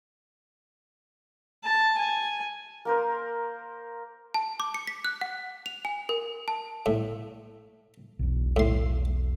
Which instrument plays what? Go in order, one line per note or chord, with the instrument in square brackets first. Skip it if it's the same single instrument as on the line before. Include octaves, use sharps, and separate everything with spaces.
[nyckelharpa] A5
G#5
[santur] A#3 A#4 C5
[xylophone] A5
D6
C#7
B6
F#6
F#5
F7
G#5
A#4
A5
[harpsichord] A2
[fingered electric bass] E1 B1
[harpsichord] A2 C6